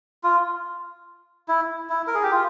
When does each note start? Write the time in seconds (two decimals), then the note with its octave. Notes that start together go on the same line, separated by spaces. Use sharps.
0.24 F4
1.48 E4
1.90 E4
2.07 A#4
2.14 G#4
2.23 G4
2.32 F4